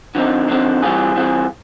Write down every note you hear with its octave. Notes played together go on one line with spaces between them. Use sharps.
D3 F3 G#3 C4 D#4
D3 F3 G#3 C4 D#4
E3 G3 C4 F4 G#4
E3 G3 C4 F4 G#4